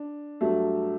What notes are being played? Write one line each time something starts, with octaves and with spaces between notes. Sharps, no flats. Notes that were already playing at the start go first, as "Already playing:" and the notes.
Already playing: D4
G2 F#3 A3